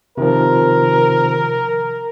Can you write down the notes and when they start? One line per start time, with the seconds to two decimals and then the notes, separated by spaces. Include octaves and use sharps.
0.17 C3 D#3 F3 A#4